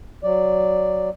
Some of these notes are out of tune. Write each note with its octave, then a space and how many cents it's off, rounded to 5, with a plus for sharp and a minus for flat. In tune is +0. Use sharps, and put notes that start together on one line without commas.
F#3 +0 D5 +0